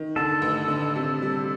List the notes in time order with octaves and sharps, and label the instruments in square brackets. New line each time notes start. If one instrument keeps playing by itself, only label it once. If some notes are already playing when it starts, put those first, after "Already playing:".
Already playing: [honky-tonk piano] D#3
[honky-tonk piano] D3 [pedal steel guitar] A4
[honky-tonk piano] A1
D3
C3
G3